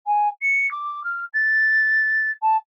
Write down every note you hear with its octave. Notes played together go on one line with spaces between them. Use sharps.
G#5
C#7
D6
F6
A6
A5